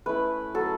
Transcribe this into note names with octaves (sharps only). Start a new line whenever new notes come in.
A3 C#4 E4 B4
F#3 A3 C#4 A4